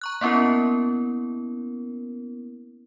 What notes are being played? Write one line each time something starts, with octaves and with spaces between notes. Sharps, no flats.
A#5 C#6 F#6
A#3 B3 C#4 E4 A#4